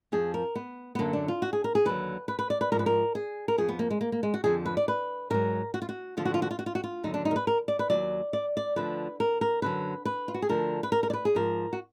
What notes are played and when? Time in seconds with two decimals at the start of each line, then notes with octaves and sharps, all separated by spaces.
0.12 F2 F3 G#4
0.34 A#4
0.55 B3
0.95 B3
0.99 F#2 D3 F#3 A#3
1.13 D4
1.28 F4
1.42 F#4
1.53 G#4
1.64 A#4
1.75 G#4
1.85 D#2 D3 F#3 B4
2.28 B4
2.39 B4
2.50 D5
2.61 B4
2.72 G#2 F3 A#4
2.79 B4
2.86 A#4
3.15 G#4
3.48 A#4
3.58 F2 F3 G#4
3.69 B3
3.79 A#3
3.90 G#3
4.01 A#3
4.12 A#3
4.23 G#3
4.34 F#4
4.44 F2 D3 F3 G#4
4.66 B4
4.77 D5
4.88 B4
5.30 G#2 F#3 A#4
5.74 F#4
5.82 F4
5.89 F#4
6.17 D#2 D3 F3 F4
6.25 F#4
6.34 F4
6.42 F#4
6.51 F4
6.59 F#4
6.66 F4
6.75 F#4
6.84 F4
7.03 D#2 D3 F#3 D#4
7.14 D4
7.25 D#4
7.31 A#4
7.36 B4
7.47 A#4
7.68 D5
7.79 B4
7.90 D#3 F#3 D5
7.94 D#2
8.33 D5
8.57 D5
8.76 D2 D3 F3 B4
9.20 A#4
9.41 A#4
9.62 F#2 D3 F#3 B4
10.05 B4
10.28 F4
10.34 F#4
10.42 G#4
10.49 D2 D3 F3 A#4
10.83 B4
10.92 A#4
11.03 A#4
11.10 D5
11.13 B4
11.25 G#4
11.35 G#2 F3 A#4
11.73 F#4